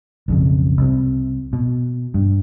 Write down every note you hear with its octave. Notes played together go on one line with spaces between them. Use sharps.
B1 F2 C#3
C2 C3
B2
G2